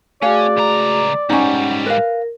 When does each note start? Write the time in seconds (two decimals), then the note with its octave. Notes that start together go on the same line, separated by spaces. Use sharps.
0.22 A3 C#4 F#4 G#4 D5 F5
0.57 C#2 A#5
1.30 G#2 G3 C#4 D#4 F#5
1.86 A#4 B4 F5